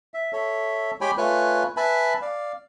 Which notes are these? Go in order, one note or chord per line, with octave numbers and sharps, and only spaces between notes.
E5
A4 C#5 E5
G#3 G4 C#5 G5 G#5 B5
A3 F4 B4 C#5 G#5 F#6
B4 E5 G#5 A5 B5
D5 F5